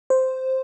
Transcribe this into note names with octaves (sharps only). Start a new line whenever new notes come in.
C5